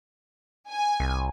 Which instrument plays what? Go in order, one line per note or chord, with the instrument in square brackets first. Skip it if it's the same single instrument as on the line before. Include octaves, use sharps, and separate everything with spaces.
[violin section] G#5
[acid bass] C2